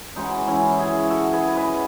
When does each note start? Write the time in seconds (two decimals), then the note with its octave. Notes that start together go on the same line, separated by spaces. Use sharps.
0.16 C#3 E3 G#3 D#4 F#4
0.47 C#4 E4
0.79 E4 G#4
1.10 F#4 A4
1.33 G#4 B4
1.56 B4 D#5